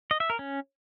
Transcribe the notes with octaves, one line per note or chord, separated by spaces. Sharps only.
D#5
E5
A#4
C#4